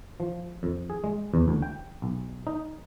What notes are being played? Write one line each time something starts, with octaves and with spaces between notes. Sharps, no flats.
F3
F2
G#4
G#3
E2
D2
G5
B1
D#4